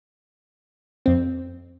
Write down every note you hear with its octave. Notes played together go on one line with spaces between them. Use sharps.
F2 C4